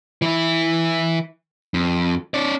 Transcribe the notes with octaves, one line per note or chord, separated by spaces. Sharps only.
E3 E4
F2
C#4 D5